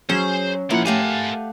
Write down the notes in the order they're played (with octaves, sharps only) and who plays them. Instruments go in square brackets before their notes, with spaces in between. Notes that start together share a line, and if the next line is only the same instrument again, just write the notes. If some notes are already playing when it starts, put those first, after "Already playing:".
[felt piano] F#3 [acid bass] C#4 [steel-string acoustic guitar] G#4 [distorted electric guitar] C5
[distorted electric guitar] A2 F#5 [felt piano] F3 E4 [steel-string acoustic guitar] A#3 F4
[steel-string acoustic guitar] A3 F5 F#5 [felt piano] G4 [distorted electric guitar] A#4 G#5